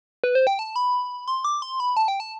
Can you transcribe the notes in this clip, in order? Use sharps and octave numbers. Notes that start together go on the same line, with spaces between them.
B4
C5
G5
A5
B5
C6
D6
C6
B5
A5
G5
A5